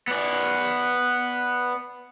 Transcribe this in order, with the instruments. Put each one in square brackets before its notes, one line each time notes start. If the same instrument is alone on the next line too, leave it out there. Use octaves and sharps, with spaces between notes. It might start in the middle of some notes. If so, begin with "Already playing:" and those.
[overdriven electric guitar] B3 D5